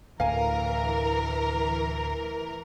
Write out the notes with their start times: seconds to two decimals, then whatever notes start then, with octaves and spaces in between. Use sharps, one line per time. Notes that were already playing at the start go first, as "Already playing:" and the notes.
0.20 D2 A2 E3 A#4 F5 G#5